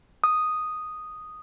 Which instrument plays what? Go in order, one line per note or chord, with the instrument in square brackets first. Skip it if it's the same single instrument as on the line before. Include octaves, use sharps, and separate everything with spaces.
[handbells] D#6